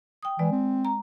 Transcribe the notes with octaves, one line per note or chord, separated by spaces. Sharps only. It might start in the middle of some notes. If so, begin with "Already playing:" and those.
G5 D#6
E3 G#3 D5
C4
A#5